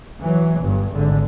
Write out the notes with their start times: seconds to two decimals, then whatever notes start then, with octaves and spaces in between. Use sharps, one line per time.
0.20 E3 F#3
0.60 G1 G2
0.93 G#1 D3